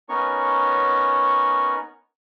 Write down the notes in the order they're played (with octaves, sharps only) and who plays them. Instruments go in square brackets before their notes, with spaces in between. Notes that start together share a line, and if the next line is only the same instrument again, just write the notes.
[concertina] B3 C#4 D#4 A#4 C#5 C#6